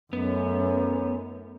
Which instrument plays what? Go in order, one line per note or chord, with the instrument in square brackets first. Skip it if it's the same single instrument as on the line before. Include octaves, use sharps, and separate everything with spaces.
[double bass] F#2 [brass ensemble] A3 C#4 D#4 [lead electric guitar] B3